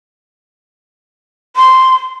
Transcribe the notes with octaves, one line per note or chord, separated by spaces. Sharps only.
C6